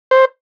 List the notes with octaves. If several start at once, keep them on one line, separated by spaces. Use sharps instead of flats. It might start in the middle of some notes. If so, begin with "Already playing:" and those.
C5